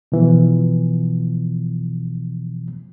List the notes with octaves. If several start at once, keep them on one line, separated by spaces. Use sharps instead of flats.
B2 E3 F3